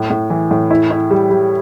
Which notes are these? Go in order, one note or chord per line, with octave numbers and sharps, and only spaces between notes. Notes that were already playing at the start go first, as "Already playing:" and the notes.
Already playing: A2
A2
E3
A2
E4
E4
G3
G3